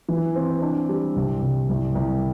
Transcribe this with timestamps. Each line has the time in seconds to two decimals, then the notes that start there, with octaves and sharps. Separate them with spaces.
0.09 E3
0.35 C4
0.62 D4
0.89 G3
1.16 C2
1.42 C3
1.69 C2
1.95 C2